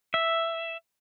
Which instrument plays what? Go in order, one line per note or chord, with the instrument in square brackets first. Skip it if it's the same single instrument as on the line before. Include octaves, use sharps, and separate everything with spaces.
[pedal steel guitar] E5